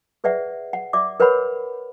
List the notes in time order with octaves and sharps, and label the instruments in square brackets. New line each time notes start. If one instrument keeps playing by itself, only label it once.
[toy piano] G#4 B4 D5 E5 F#5
F#5
D5 E5 D6
A#4 B4 C#5 F#5 B5